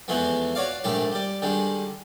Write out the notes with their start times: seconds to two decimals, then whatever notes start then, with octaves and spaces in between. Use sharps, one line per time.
0.08 E2 E3 F3 G#3 A3 B3
0.55 F#4 C#5 D5 F5
0.84 A#1 G#2 D#3 A3 G4 A5
1.12 G3 D5
1.42 D3 D#3 G3 G#3